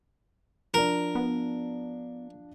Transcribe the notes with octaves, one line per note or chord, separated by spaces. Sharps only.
F3 D4 A#4
B3